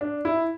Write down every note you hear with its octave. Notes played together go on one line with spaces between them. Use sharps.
D4
E4